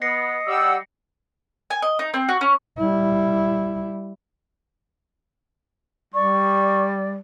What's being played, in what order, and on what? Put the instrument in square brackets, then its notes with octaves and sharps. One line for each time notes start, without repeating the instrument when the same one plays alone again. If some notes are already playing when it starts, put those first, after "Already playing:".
[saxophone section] B3 [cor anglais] D#5 [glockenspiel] A#6 C7 C#7
[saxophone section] G3 [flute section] F#5 E6
[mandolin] G#5
D#5
D#4
C4
F#4
C#4
[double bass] G3 E4
[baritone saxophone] G3 [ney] D5 [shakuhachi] C#6